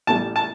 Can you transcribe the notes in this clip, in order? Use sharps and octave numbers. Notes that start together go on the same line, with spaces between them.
A1 A2 G3 A5
A5